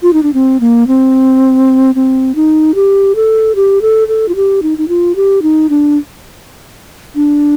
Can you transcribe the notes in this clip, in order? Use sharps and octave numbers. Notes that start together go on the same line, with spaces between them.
F4
D#4
D4
C4
A#3
C4
C4
D#4
G4
A4
G4
A4
A4
F4
G4
D#4
D#4
F4
G4
D#4
D4
D4